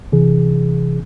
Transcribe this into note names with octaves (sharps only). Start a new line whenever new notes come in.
C3 E3 G#4